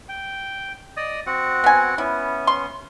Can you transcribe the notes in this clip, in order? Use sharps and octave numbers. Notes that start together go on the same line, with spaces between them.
G5
D5 D#5 D#6
C4 F#4 F#5
B3 G#5
B3 C#4 E4
C6